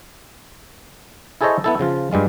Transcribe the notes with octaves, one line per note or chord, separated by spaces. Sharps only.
E4 G#4 A4 C5 C#5 D#5
B3 E4 A4
C#3 F3 F4
G2 G3 G#3 F4